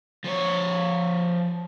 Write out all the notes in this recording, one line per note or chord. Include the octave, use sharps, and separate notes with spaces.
F3 C#5